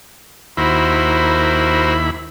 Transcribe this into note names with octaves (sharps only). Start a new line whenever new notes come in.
D#2 E4 F#4 A#4 C5 B5